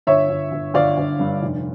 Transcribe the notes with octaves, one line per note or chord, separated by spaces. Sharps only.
G1 C#5 E5
G1
G1
G1 D5 F5
G1
G2
F1